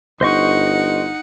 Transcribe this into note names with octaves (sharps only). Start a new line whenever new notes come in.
G1 D#4 C5 D#5 F#5 C#6